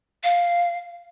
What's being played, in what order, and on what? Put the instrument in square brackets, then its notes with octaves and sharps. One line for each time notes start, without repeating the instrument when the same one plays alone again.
[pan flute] F5